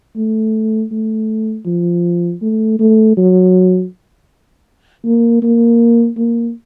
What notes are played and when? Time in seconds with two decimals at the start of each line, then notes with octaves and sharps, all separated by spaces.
0.16 A3
0.91 A3
1.66 F3
2.42 A3
2.79 A3
3.17 F#3
5.05 A#3
5.42 A#3
6.17 A#3